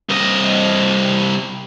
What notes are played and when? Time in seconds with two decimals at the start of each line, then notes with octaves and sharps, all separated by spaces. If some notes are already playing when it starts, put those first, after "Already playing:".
0.10 C2 D#5